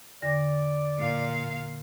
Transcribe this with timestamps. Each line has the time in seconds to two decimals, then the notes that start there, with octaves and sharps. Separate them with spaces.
0.22 E2 D3 D5 A#6
0.98 A#2 F5